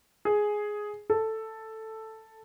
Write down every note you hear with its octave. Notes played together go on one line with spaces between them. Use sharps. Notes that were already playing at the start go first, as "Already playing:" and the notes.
G#4
A4